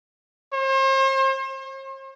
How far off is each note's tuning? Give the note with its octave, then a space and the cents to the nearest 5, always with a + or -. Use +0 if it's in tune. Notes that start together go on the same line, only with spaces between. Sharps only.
C5 +40
C5 +45